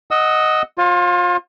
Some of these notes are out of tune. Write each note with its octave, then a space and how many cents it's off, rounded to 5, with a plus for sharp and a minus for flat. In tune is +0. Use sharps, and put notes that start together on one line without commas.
D#5 +0 F#5 +0 E6 -25
F4 +25 C#5 -45